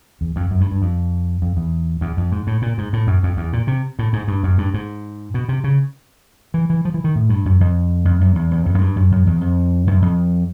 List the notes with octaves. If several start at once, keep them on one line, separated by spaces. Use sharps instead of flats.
E2
F2
F#2
G2
G2
F2
F2
E2
E2
F2
G#2
A2
A#2
G#2
A2
F#2
F2
E2
A#2
C3
A2
G#2
G2
F#2
G2
G#2
B2
C3
C#3
E3
E3
F3
E3
D#3
A2
G2
F#2
F2
F2
F#2
E2
E2
F2
F#2
G2
F#2
F#2
E2
F2
F#2
F2